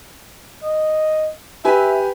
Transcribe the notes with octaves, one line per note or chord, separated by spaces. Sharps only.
D#5
G4 B4 E5 G#5